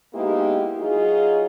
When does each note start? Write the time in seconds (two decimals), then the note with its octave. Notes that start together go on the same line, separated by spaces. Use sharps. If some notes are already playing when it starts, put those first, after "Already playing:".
0.14 G#3 A#3 B3 D#4 E4 G4
0.79 F#3 D#4 F4 F#4 G#4